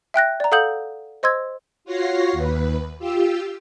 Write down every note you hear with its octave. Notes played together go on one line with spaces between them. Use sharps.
E5 G5 F#6 A#6
D5 A#5
A4 F5 F#5 D#6 G6 F#7
C5 D#5 C6 E6 G#6
F4 F#4 C#5 A#6 C7
D#2 B4
F4 G4 E6